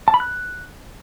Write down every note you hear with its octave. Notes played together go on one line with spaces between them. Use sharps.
A5
B5
F#6